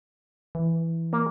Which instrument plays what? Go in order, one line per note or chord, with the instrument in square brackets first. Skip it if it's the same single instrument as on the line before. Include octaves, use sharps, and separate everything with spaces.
[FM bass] E3
[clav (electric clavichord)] A#3